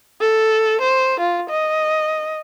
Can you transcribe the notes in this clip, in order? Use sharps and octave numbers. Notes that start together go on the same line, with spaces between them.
A4
C5
F4
D#5